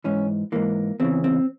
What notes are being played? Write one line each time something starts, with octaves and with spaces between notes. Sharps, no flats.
G#2 E3 C#4
G#2 E3 A#3
E2 C#3 E3 C4
C4